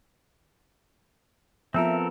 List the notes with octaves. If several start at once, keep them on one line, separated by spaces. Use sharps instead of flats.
F3 B3 C4 F4 A4 A#4 E5